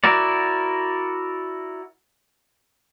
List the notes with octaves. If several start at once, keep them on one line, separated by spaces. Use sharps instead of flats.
E4 F#4 A#4 D5